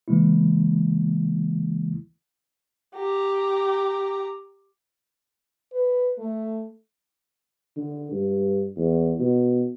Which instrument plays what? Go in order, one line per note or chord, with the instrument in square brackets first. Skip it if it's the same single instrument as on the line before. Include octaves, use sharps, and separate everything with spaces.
[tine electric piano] C#3 E3 G#3 A#3 E4
[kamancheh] G4 A#5
[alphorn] B4
A3
[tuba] D3
G2
E2
B2